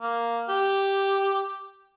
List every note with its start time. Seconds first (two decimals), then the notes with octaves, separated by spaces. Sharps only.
0.01 A#3
0.49 G4